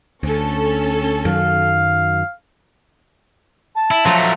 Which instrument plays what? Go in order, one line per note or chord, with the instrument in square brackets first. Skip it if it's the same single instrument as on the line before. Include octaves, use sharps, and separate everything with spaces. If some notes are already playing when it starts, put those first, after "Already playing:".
[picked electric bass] D2 [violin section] C#4 A4
[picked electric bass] F#2 D#3 F#3 [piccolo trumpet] F5
[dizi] A5
[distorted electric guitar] E4
[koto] F3 A#5 [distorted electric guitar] F#3 A3